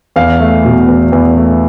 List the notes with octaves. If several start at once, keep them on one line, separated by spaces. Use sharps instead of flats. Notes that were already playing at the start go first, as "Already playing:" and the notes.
E2 F5
A3
B2
E2
E2
A3